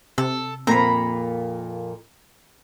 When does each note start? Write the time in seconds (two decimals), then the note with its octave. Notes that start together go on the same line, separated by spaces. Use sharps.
0.18 C3 A4
0.67 F2 A#2 A#3 C4 A#5 B5